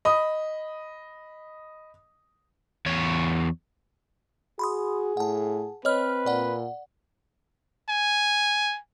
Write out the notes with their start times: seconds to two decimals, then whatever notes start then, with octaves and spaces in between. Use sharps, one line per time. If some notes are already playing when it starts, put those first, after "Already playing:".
0.05 D#5 B5 D#6
2.86 E2 C#5
4.59 F#4 G#4 B5 C6 D#6
5.17 A2 F#5 A5
5.85 C4 B4 C#5 D#5 F6
6.26 A#2 D5 F#5
7.89 G#5